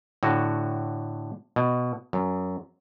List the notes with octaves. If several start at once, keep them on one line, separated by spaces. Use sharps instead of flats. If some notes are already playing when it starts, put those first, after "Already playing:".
A2 D3 F#4
B2
F#2